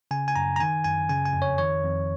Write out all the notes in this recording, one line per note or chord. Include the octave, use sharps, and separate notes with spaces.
C#3 G#5
G#5
F#2 A#5
A#5
D#3 G#5
F#2 G#5
C#3 G#5
G#5
F2
C#5
D#3 C#5
F2